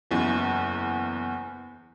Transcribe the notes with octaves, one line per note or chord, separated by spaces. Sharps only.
F#1 E2